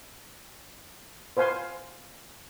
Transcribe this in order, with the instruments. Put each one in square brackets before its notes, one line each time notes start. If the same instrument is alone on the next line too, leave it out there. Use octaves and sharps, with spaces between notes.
[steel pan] B4 C5 F5 G#5 C6